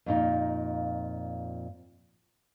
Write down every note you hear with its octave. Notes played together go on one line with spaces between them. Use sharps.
F2 A#2 D#4